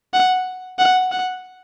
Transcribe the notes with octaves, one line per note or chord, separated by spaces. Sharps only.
F#5
F#5
F#5